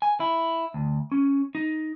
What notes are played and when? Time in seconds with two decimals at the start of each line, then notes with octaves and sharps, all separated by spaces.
0.02 G#5
0.20 E4
0.74 D2
1.12 C#4
1.55 D#4